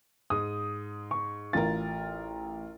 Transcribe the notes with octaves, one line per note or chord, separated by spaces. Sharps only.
G#2 D#6
C#6
A1 F4 A#4 A6